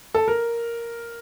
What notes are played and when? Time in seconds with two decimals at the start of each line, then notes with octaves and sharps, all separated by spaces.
0.14 A4
0.28 A#4